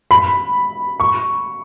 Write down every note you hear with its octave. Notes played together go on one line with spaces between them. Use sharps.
B5
C#6